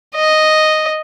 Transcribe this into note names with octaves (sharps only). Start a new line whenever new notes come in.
D#5